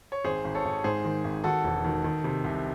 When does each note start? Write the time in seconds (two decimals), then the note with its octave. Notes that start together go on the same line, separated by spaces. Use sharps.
0.12 C#5
0.25 G#1 G#4 C5
0.44 G#1
0.55 A4 C#5
0.65 G#1
0.84 G#2 G#4 C5
1.04 D#3
1.24 G#1
1.44 D#3 F#4 A4
1.64 E1
1.84 D#3
2.04 D#3
2.24 C3
2.44 C2